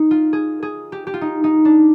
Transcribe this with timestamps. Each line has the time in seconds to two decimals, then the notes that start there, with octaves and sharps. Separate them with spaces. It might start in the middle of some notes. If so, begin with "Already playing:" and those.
Already playing: D#4
0.11 F4
0.33 G#4
0.63 G#4
0.92 G4
1.07 G4
1.14 F4
1.21 D#4
1.44 D#4
1.65 D4